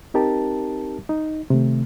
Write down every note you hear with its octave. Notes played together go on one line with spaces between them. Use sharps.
C4 D#4 G4 A#4 A5
D#4
C3 D#3 A3